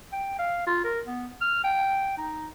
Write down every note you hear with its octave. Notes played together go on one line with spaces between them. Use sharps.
G5
F5
F4
A#4
B3
F6
G5
D#4